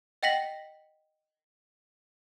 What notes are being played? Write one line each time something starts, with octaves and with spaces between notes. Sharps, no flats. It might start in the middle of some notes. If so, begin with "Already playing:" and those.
D#5 F#5 G5 A#6 B6 F#7